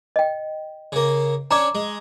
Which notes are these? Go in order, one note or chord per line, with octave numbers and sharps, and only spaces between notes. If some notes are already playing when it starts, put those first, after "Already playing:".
D#5 G5
C#3 A#3
C#4 D4 C#5 A#5 D6
G#3